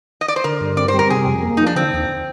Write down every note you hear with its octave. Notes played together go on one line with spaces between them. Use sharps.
D#5
D5
C5
D3 A#4
G2
C4 D5
C5
G3
A#4
C3 G#4
F2
A#3
F3 D#4
D4
D3 C4
D#2